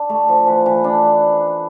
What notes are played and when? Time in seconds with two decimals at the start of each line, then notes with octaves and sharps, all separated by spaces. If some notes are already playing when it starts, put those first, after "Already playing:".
Already playing: D4
0.09 A3
0.29 F3
0.47 E3
0.66 E3
0.84 D4